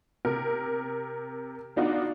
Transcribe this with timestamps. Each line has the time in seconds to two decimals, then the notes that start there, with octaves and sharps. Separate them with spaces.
0.25 C3 A#4
1.76 B3 D4 D#4 F4 F#4